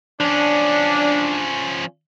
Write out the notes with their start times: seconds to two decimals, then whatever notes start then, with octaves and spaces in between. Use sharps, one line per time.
0.21 F3 C#4 D4